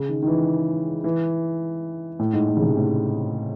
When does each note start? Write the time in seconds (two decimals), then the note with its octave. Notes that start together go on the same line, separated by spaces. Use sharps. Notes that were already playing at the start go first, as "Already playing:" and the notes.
Already playing: C#3
0.09 D#3
0.22 D#3
0.27 E3
1.04 E3
2.19 A2
2.33 G#2
2.48 A2
2.57 C#3
2.63 C3
2.77 A2